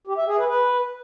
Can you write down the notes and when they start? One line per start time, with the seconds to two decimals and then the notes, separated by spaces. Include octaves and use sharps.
0.07 G4
0.17 E5
0.28 G#4
0.38 B4
0.48 B4